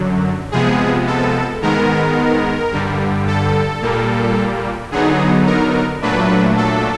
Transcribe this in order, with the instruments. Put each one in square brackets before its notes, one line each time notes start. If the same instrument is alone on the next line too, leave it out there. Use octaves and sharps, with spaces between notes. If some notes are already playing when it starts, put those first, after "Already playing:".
Already playing: [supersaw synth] F#2 D3 F#3
C3 F3 G#3 B3 G#4
A4
G#2 D#3 G#3 B3 A#4
G2 D3 G3
A4
A#2 G3 A#3
D3 F#3 B3 D#4 G#4
A#4
A#2 F#3 A3 D4 B4
A4